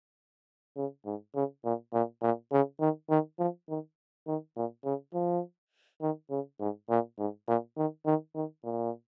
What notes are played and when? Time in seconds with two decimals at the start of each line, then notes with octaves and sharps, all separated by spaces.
0.77 C#3
1.06 G#2
1.35 C#3
1.64 A#2
1.93 A#2
2.22 A#2
2.52 C#3
2.80 D#3
3.10 D#3
3.39 F3
3.69 D#3
4.27 D#3
4.56 A#2
4.85 C#3
5.14 F3
6.01 D#3
6.31 C#3
6.60 G#2
6.89 A#2
7.19 G#2
7.48 A#2
7.77 D#3
8.06 D#3
8.35 D#3
8.64 A#2